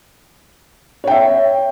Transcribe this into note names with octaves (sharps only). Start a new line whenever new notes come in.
C#5 E5 G5